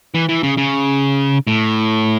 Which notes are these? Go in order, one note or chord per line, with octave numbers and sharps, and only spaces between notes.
E3
E3
C#3
C#3
A2